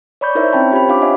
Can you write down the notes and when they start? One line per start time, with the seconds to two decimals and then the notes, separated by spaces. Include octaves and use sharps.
0.21 C#5 D5 B5 C#6 G6
0.35 D#4 E4 A#4 C5 C#5 E5
0.53 C4 C#4 G5 A5 B5
0.72 F4 G4 C5 C#5 B5
0.88 D4 F4 F5 B5 D6
1.02 G4 C#5 D#5 E5 F#5 G#5